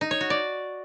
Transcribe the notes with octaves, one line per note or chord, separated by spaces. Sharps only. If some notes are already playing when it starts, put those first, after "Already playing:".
D#4
C#5
F#4
D5